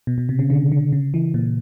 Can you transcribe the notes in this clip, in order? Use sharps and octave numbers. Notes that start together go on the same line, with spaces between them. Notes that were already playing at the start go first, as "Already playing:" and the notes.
B2
B2
C3
C#3
D3
D3
C#3
E3
A#2